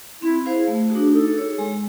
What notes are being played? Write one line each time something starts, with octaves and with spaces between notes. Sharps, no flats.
C4 E4
E4 G#4 C5 F5
A3
F#4 G#4
D4
D#4 A4
G#4 C#5
G#3